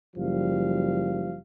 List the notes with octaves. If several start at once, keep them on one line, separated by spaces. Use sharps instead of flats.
F#1 F3 G3 F5